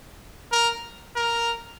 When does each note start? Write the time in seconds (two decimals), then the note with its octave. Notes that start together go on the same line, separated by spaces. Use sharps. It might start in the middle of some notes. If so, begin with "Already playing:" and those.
0.52 A#4
1.16 A#4